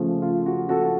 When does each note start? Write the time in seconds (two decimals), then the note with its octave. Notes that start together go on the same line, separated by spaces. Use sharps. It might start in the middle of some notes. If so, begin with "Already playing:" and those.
Already playing: C#3 F3 A3
0.22 F4
0.46 F#4
0.69 F#4 A4
0.84 A4